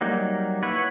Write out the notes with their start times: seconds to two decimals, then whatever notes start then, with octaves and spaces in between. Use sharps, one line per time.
0.01 F#3 G3 A#3 D#4
0.63 E4 B4 C#5 F#5